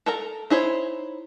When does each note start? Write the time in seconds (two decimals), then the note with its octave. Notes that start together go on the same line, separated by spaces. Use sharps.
0.06 A4 A#4 A#5
0.50 D#4 E4 C5 C#5